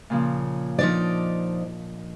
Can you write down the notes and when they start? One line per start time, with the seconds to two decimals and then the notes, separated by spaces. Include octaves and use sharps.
0.10 A#2 C#3 F3
0.79 F3 D4 D#4 D5 D#5